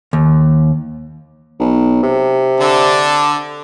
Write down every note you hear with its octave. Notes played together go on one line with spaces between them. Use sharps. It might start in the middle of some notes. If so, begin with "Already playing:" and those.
D#2
B1
C3
D3 D4 A4